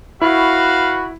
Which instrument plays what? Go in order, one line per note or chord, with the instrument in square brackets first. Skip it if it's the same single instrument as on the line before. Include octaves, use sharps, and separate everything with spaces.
[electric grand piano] E4 [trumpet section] F#4 [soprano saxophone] B4 [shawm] F5